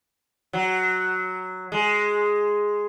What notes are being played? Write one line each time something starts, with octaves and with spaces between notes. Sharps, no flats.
F#3
G#3